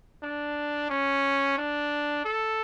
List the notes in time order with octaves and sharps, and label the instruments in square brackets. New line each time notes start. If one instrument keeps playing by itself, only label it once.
[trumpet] D4
C#4
D4
A4